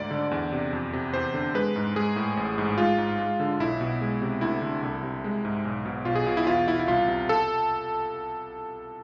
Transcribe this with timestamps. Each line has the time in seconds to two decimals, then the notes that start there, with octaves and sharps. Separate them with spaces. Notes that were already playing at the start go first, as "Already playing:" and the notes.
Already playing: D2 G#2 D5
0.11 D3
0.31 E2
0.52 C3
0.73 F2
0.93 C3
1.14 E2 C5
1.34 D3
1.54 G#3 B4
1.76 G#2
1.96 G#3 G#4
2.16 A2
2.37 A1
2.58 G#2
2.78 G#3 F4
2.98 G#2
3.19 G#3
3.40 D3
3.60 B1 E4
3.81 B2
4.01 G#3
4.22 C3
4.41 D2 E4
4.62 D3
4.83 C2
5.03 C3
5.24 G#3
5.45 G#2
5.65 B1
5.85 B2
6.05 B1 F4
6.16 G#4
6.26 B2 F4
6.37 E4
6.46 E2 F4
6.67 B2 E4
6.79 E4
6.87 C2 F4
7.08 C3
7.29 A4